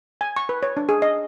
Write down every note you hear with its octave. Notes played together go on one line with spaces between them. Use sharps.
G#5
C#6
B4
C#5
D4
G#4
D#5